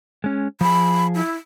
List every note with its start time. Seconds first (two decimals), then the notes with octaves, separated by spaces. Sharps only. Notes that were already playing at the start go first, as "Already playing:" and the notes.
0.24 G#3 C#4
0.61 F3 G#4 B5
1.15 E4